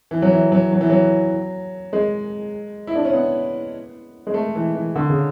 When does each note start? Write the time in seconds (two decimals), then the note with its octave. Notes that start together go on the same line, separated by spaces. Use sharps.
0.11 E3
0.22 F#3
0.31 E3
0.52 F#3
0.72 F#3
0.81 E3
0.90 F#3
1.93 G#3
2.87 E4
2.95 D4
3.05 C#4
3.13 B3
4.27 G#3
4.34 A3
4.55 E3
4.75 E3
4.96 D3
5.10 C#3